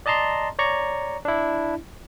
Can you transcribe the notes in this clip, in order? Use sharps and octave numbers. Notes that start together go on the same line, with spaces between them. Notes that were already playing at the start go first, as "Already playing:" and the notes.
D5 D#5 A5 A#5 C6
C#5 D5 A#5 C#6
D4 E4